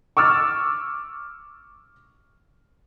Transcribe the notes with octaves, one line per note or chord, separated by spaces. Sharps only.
C#6 D6 E6 F6 A6